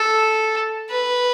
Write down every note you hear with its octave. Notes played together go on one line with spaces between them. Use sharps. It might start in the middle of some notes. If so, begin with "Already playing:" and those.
Already playing: A4
B4